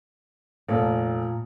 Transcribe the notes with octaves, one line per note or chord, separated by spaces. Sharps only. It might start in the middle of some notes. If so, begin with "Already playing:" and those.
F1 A#2